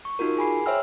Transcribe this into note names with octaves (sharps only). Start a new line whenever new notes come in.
C#6
D#4 F4 F#4 A#4
G#4 G#5 B5 C7
C5 C#5 E5 G5 E6 F6